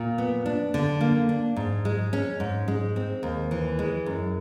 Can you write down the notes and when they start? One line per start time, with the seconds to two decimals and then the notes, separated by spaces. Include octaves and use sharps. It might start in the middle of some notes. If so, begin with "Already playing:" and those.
Already playing: A#2
0.18 B3
0.46 D4
0.74 D3
1.01 A#3
1.29 D4
1.56 G#2
1.85 G#3
2.13 C#4
2.40 G#2
2.68 G#3
2.96 C4
3.23 D#2
3.51 E3
3.79 G#3
4.06 F#2